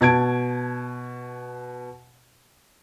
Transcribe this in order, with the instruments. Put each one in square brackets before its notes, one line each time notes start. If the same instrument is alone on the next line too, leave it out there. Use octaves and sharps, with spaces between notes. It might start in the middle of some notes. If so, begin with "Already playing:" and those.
[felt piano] B2 A5 G#6 D7